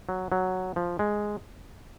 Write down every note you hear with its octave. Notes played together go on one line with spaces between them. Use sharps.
F#3
F#3
F3
G#3